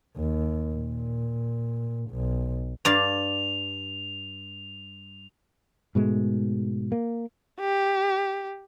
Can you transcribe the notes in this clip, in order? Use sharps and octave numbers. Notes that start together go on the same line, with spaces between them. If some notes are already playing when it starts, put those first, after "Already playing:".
D#2
A#2
B1
G2 D5 F5 F7
G#2 B2 G#3 A3
A#3
G4